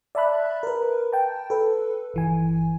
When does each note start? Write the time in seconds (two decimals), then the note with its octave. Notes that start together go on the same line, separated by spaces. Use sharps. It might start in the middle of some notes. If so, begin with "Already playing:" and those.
0.15 D5 E5 A5 B5 F#6
0.63 A#4 B4
1.13 G5 A5
1.50 A4 B4
2.14 G1 E3 G#5